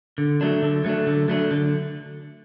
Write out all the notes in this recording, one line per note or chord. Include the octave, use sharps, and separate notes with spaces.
D3
F#3 A3 D4
D3
F#3 A3 D4
D3
F#3 A3 D4
D3